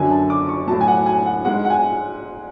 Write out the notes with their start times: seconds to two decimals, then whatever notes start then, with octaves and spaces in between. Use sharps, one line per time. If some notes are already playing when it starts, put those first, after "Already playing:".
Already playing: F#2 D3 F#3 G#5
0.11 A5
0.30 D6
0.49 C#6
0.67 A2 F#3 A5
0.81 G#5
0.88 F#5
1.06 G#5
1.26 F#5
1.45 G#2 G#3 F#5
1.65 F#5
1.70 G#5